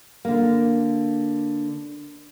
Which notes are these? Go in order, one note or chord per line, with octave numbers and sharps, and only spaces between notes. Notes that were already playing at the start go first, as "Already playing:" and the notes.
D3 A#3